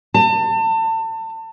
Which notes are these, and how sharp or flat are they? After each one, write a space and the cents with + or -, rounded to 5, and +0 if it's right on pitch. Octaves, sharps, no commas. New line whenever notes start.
A5 +35